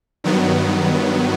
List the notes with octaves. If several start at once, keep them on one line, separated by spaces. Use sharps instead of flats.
G2 D#3 F#3 B3